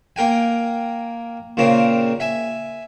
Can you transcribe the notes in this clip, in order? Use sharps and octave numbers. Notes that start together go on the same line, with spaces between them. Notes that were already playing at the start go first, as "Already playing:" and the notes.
A#3 A#4 G5 G#5
A#2 C#3 C4 A#4
E5 G#5